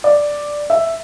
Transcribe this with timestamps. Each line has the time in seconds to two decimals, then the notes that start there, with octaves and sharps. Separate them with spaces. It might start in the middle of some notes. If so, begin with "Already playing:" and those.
0.04 D5
0.70 E5